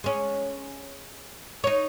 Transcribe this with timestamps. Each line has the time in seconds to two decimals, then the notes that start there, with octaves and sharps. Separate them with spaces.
0.04 G#3 C#4
1.64 D#4 C#5